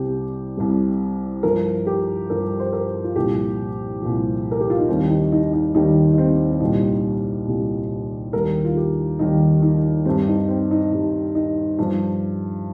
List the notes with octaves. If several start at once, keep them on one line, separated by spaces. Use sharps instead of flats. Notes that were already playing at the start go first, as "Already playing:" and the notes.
Already playing: C2 C3 G3 G4
C2 C3 G3
G2 F3 A#4
G4
G2 F3 A#4
C5
A#4
F4
C2 A#2 F3 G4
C2 A#2 F3
A#4
G4
F4
D#4
D#2 D#3 G3 C4
D#4
D#4
D#4
D#2 D#3 G3 D#4
D#4
C4
C4
C2 A#2 G3 D#4
C2 A#2 G3
D#2 D#3 G3 A#4
F4
G4
D#2 D#3 G3 D#4
D#4
G2 G3 C4
D#4
C4
D#4
G2 G3
D#4
G2 F3